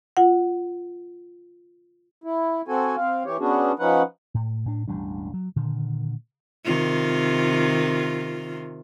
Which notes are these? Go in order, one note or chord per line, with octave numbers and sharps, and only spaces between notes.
F4 F#5
E4
C4 F#4 A4 G#5
C4 F5
E3 G4 C#5
B3 C#4 D4 F#4 G#4
F3 C#4 D#4 B4 F#5
A2
A2 D4
E1 A1 G3 D4
F#3
A#2 D3 D#3
C3 D#3 F4